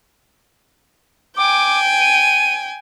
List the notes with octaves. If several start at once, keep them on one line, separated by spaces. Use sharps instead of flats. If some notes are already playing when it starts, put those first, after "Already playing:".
G5 G#5 D6
D#7